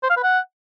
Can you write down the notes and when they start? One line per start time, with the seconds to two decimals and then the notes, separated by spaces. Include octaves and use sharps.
0.03 C5
0.10 F5
0.17 B4
0.23 F#5